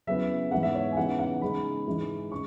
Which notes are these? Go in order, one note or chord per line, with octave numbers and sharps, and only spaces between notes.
C#3 F#3 B3 E4 E5
G#2 E3 B3 F#5
E5
C#5
G#5
C#3 E3 B3 D#4 F#5
F#5
C#3 G#3 D#4 B5
G#2 E3 G#3 D#4
C#3 C#6